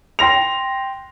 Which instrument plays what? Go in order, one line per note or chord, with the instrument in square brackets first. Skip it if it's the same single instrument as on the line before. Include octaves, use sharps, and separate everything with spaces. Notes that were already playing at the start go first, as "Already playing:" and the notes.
[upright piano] G5 C6 A#6 F7